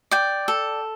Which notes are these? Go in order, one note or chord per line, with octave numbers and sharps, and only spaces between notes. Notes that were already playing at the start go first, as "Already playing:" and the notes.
D5 G5
A4